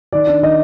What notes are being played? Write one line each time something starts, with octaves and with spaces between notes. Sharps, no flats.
D#3 D5
D4
D#3 D#5